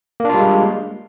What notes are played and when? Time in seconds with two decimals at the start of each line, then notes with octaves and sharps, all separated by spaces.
0.20 A#3
0.25 D4
0.30 F4
0.34 G3
0.39 G#3